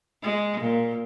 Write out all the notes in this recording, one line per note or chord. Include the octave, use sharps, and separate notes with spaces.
G#3
A#2